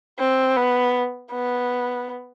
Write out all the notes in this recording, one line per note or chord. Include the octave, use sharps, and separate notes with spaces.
C4
B3
B3